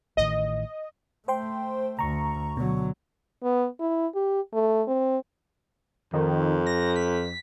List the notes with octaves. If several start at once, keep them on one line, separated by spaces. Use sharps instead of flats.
A1 A2 D#3 D#5
A3 C5 G5 C6
D2 A#5 C#6
B2 D3 F#3
B3
E4
G4
A3
C4
F2 D#3
A#6
B6